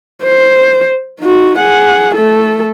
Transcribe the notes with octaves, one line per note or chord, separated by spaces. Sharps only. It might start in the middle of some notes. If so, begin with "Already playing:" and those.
C5
D#4 F#4
G#4 F#5
A3 A4